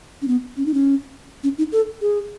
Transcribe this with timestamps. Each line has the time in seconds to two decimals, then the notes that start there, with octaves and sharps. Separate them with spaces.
0.22 C#4
0.28 B3
0.57 C#4
0.66 D#4
0.74 C#4
1.44 C#4
1.58 D#4
1.72 A4
2.01 G#4